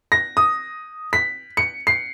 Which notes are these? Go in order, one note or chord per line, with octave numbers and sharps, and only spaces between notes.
A#6
D#6
B6
C#7
C7